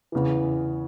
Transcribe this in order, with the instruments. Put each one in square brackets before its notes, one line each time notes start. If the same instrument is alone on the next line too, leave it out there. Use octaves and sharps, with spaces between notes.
[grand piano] E2 C#3 E3